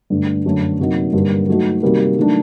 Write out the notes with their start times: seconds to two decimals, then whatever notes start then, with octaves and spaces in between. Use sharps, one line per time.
0.10 G2 D3 A3
0.45 F#2 D3 A3 D4
0.79 C3 F#3 A#3 D#4
1.13 G2 D3 G3 A#3
1.47 F#3 A3 D#4 F#4
1.82 C3 D#3 G3 A#3 F#4
2.17 D#3 F#3 A3 D4